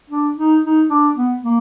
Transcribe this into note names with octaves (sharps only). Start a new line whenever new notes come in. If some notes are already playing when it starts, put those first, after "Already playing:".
D4
D#4
D#4
D4
B3
A#3